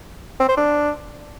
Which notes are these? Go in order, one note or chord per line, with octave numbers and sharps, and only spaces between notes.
C4
C5
D4